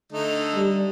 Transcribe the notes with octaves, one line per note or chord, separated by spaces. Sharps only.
D3 A3 D#4
G3